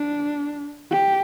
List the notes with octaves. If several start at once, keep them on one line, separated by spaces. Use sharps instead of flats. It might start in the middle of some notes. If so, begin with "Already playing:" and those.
Already playing: D4
G4